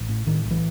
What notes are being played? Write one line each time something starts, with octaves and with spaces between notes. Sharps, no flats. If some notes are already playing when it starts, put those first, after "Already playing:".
Already playing: A1 E3
A2
A2 D#3
B1
E3